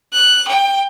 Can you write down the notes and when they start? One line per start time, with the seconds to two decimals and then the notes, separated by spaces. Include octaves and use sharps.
0.13 F#6
0.48 G5